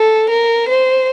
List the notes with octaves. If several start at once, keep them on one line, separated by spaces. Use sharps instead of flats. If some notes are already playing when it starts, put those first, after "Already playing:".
Already playing: A4
A#4
C5